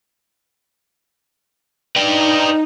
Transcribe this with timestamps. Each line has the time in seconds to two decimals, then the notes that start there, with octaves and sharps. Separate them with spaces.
1.96 D#4 B4 D5 G5